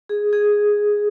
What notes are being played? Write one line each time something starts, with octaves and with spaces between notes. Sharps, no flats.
G#4
G#4